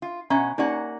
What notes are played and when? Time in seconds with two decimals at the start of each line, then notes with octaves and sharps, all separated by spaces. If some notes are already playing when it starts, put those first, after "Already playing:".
0.02 F4
0.30 B2 C#4 E5 F#5 A#5
0.58 A#3 C#4 D#4 G4 D5 F#5